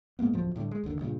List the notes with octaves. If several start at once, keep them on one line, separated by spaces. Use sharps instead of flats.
G#2 G#3 A#3 B3
D1 F2 F3 F#3
A2 D3 G3
G#3
F#1 D#2 D3 D#3
G2 A#2 C#3 G#3